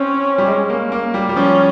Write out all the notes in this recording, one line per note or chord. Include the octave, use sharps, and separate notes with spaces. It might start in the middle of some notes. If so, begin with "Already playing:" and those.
Already playing: C4 C#4
G3
G#3
A#3
A#3
G3
G3
F3 C#4